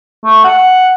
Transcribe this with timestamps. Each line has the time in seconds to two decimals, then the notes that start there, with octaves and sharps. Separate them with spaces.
0.24 A3
0.44 F#5